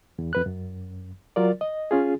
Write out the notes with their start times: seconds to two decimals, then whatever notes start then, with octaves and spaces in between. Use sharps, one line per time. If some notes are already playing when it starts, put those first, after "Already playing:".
0.19 E2
0.33 F2 B4 F#6
0.46 F#2
1.36 F#3 F4 A#4 D5
1.61 D#5
1.91 C#4 F4 G#4